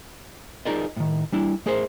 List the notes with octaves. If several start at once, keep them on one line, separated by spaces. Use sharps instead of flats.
D#4 F4 G#4 A#4 D5 D#5
A2 D#3
G3 D4 E4
A3 G#4 A#4 C5